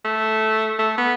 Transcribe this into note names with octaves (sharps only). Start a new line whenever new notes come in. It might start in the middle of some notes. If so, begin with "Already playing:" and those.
A3
A3
B3